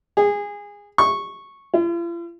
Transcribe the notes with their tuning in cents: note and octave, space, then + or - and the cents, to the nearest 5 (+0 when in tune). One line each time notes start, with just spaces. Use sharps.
G#4 -20
C#6 -10
F4 -45